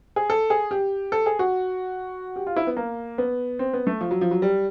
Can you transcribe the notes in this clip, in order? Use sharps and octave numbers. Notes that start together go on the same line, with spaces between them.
G#4
A4
G#4
G4
A4
G#4
F#4
G4
F4
E4
B3
A#3
B3
C4
B3
A3
F3
F#3
F3
F#3
G3